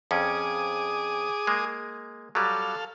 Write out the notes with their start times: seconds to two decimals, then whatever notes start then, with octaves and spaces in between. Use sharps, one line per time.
0.11 F2 C#4 G#4 D6 D#6
1.47 G#3 A#3
2.35 F#3 G3 A4 F5